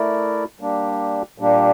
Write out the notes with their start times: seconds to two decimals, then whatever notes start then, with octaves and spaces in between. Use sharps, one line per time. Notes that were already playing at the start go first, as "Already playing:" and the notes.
Already playing: A3 E4 A#4 D5
0.60 G3 A#3 D4 G4
1.38 A#2 G3 A#3 D4 G4